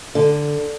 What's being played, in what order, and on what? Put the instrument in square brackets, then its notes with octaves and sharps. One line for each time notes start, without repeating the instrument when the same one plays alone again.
[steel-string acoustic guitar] D3